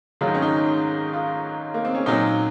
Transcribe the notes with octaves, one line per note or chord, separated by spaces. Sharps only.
G#2 D#3 F#3 F4
D#4
C#4
D#4
F4
A#3
C4
C#4
A#2 F#3 D#4